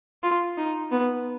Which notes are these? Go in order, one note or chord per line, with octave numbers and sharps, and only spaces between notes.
F4
D#4
B3